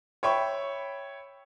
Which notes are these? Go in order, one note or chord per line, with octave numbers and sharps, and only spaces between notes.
C#5 E5 G5 B5 C#6